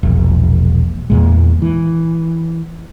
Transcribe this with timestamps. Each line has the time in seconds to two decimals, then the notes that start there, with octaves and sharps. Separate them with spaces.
0.03 E1 A#1
1.10 E2 A#2 G#3
1.62 E3